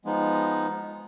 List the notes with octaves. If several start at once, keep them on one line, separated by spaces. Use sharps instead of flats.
F3 G#3 B3 D#4